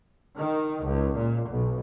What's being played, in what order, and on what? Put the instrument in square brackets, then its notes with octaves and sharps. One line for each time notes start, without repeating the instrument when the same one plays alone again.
[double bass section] D#3
C#2
A#2
B1